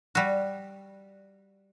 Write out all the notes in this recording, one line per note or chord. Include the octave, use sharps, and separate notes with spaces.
G3 F#4